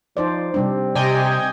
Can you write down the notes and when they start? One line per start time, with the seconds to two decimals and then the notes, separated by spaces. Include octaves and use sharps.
0.17 F3 D#4 C5 D5
0.54 C3 G3 C4 D4
0.95 C3 D5 D#5 G5 G#5